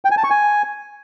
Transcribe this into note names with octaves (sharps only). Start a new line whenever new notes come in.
G5
G#5
A5
C#6
G#5